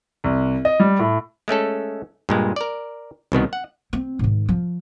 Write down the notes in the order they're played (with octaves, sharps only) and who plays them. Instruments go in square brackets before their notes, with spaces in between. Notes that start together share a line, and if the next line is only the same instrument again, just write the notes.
[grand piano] C2
D#5
G3
A2
[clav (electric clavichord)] G#3 A3 C#4 A4
G2 A#2 G#3
A#4 D5
C2 B2 D#3 B3
F#5
[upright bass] C4
G#2 D#3
F3